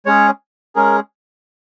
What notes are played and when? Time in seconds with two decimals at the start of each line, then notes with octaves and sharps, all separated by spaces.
0.06 G#3 C#4 G#4 C#5
0.76 G#3 C#4 G#4 A#4